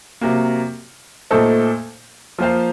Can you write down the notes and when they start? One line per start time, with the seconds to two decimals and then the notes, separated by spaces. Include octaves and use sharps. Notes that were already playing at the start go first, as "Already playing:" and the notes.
0.21 C3 F#3 A#3
1.31 A#2 A3 D#4 A4 C5
2.39 F3 A#3 F4 C5 F5